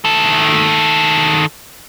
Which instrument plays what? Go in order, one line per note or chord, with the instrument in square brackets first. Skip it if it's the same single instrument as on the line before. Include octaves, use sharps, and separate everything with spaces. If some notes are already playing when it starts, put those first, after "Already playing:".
[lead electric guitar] D#3 A4